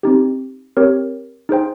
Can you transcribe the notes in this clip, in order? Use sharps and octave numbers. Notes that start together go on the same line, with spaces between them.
C4 D#4 G4
C4 G4 A#4 C#5
D#4 G#4 C5 G5